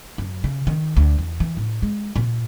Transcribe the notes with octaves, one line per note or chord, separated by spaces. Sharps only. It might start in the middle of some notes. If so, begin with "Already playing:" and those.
F#2
C#3
D#3
D2
E2
E3
A2
G#3
A#2